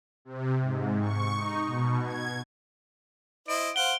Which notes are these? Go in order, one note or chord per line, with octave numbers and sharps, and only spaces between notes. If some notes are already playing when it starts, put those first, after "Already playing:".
C3
G#2
C#6
D#4
B2
G#6
E4 C5 D#5 D7
C5 F5 F#5 D7 G7